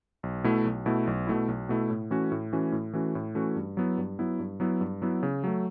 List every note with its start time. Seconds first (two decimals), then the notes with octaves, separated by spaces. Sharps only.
0.23 B1
0.44 B2 A3 E4
0.65 B1
0.86 B2 A3 E4
1.07 B1
1.27 B2 A3 E4
1.48 B1
1.69 B2 A3 E4
1.90 A2
2.10 E3 A3 C#4 F#4
2.32 A2
2.52 E3 A3 C#4 F#4
2.72 A2
2.94 E3 A3 C#4 F#4
3.15 A2
3.35 E3 A3 C#4 F#4
3.56 G2
3.77 F#3 B3 E4
3.98 G2
4.19 F#3 B3 E4
4.39 G2
4.60 F#3 B3 E4
4.81 G2
5.02 F#3 B3 E4
5.23 C#3
5.44 F#3 A3